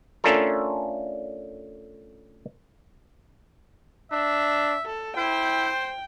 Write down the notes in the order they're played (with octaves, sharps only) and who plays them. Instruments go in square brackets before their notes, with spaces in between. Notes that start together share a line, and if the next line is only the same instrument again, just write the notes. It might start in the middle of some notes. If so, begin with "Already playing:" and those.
[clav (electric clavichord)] A3 C#4 D4 F4 A4 A#4
[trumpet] D4 [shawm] E5
[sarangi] A4
[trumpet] E4 [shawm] C5 [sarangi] G5